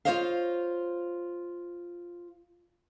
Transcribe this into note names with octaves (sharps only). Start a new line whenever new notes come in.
F4 F#4 C5 C#5 D#5 F5